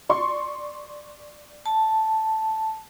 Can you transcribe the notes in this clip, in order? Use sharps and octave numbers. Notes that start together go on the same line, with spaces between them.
D5 C6 C#6
A5